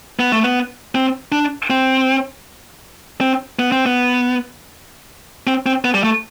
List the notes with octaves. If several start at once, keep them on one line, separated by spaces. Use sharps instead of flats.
B3
A3
B3
C4
D4
C4
C4
B3
C4
B3
C4
C4
B3
G3
A3